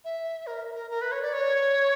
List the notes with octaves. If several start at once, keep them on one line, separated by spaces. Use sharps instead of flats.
E5
A#4
A#4
A#4
B4
C#5
D5
C#5